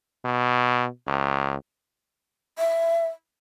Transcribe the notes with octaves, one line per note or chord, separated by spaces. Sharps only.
B2
C#2
E5